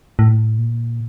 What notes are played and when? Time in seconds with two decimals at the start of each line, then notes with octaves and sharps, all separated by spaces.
0.19 A2
0.58 A#2